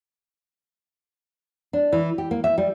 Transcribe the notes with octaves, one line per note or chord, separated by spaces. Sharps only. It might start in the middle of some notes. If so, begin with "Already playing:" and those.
D4
E3
G4
A#3
E5
G3